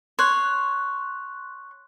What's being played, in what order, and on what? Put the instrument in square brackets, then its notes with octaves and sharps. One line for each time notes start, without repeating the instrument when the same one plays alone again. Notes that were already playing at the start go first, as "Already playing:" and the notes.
[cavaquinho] C#5 [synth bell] C6 F#6